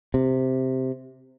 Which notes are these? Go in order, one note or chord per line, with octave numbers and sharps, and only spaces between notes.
C3